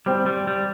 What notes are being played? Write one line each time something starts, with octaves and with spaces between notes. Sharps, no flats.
G3 C4
G3
G3